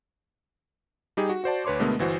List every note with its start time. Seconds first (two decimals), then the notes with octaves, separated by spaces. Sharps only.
1.17 G3 D#4 G4 G#4
1.29 F#4
1.44 F#4 C5 D5 A5
1.65 D2 B4 C#5 C6 D6
1.79 B2 D3 G#3 A3 B3 A#4
1.99 G1 E3 F#4 C5